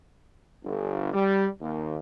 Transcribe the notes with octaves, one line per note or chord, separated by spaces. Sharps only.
G1
G3
D#2